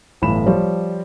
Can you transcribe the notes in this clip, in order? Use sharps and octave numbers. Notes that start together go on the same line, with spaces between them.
G1 A2 E3 B5 E7
F3 G3 C#5